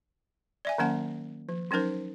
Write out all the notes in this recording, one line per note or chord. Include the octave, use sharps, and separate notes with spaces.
D5 E5 G#5
D#3 F#3 A#3 C#4 F#5 A5
F3
F#3 C#4 D#4 A#4 C5